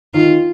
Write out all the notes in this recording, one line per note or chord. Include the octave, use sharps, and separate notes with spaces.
D#3 F4